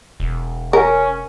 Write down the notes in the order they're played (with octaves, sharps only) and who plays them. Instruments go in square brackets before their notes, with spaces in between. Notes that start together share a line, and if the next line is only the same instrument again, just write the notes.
[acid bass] E1
[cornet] C#4 [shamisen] A#4